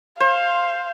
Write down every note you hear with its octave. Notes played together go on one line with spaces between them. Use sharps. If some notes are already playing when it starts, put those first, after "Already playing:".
C5 F5